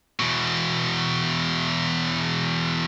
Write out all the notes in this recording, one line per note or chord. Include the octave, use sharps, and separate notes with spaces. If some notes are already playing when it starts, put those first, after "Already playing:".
E2 B2